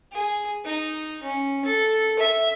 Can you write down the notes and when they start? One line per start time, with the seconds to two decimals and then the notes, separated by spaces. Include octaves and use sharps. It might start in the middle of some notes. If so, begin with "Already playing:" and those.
0.12 G#4
0.65 D#4
1.23 C#4
1.65 A4
2.19 E5